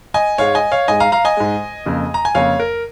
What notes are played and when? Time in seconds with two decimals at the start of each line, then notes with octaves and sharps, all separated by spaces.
0.14 D#5 G#5
0.38 G#2 G#3 C#5 F5
0.55 D#5 G#5
0.72 C#5 F5
0.88 G#2 G#3 D#5 G#5
1.00 F5 A#5
1.12 F5 A#5
1.25 D#5 G#5
1.37 G#2 G#3
1.86 F2 C#3 A#3
2.14 A#5
2.25 G#5
2.35 F2 C#3 A#3 C#5 F5
2.60 A#4